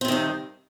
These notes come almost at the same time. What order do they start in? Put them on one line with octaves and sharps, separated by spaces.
C4 C3 D#3 G2